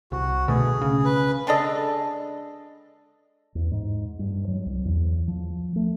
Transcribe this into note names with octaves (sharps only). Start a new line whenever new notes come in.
C2 F#4
B2 D3 A3 G#4
C#3
B4
G#3 D4 A4 D#5
E2
G#2
G2
F#3
C2
E2
F3
A3